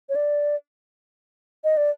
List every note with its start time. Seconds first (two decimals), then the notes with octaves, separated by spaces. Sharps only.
0.09 C#5
0.15 D5
1.64 D#5
1.77 D5